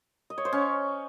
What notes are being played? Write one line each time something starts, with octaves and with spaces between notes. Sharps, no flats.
D#5
C#5
C5
C#4